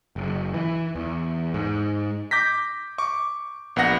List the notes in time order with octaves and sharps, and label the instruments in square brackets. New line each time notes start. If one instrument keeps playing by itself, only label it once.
[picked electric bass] F#1
E3
E2
G#2
[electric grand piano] D6 G6 A#6 B6
C#6 D6
A#1 B3 F#5 A#6